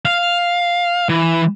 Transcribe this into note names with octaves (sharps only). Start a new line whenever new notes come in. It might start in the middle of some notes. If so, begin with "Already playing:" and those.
F5
E3